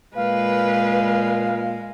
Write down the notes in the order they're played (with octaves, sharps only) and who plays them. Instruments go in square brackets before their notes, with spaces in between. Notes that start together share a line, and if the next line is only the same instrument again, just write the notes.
[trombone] A#2 [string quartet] G#3 [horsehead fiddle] B4 [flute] F5